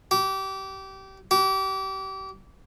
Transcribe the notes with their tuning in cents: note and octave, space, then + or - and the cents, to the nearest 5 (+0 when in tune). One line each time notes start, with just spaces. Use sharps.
G4 -25
G4 -30